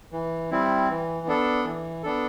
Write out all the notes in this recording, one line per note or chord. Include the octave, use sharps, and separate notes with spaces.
E3
G3 C4 E4
E3
B3 D4 A4
E3
B3 D4 A4